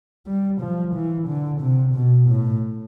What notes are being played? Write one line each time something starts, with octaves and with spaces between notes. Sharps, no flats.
G3
F3
E3
D3
C3
B2
A2